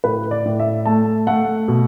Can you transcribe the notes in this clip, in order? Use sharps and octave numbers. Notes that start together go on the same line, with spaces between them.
A2 B4
D5
A2
E5
A3 A5
A3 F#5
B2